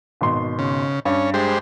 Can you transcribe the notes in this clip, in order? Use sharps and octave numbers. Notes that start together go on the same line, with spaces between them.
G#1 B2 C6
C#3
G2 C#4
G#3 G4 C5